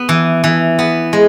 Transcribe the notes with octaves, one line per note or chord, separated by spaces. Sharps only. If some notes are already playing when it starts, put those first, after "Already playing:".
Already playing: B3
E3
E3
B3
G#3